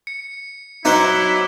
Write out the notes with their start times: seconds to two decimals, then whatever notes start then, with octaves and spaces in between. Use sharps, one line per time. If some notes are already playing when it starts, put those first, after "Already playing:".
0.07 C#7
0.85 F#3 D#4 E4 C5 D6 F#6 G7